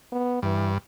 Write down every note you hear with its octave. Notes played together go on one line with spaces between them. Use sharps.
B3
G2 E3